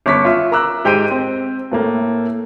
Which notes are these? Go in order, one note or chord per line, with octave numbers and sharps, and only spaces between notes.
G1 C#4 C#6 D6 B6
F4 E5
A#4 A#5 D6 E6 F#6
G#2 G4 C5 G5 D7 D#7
C4
A2 A3 A#3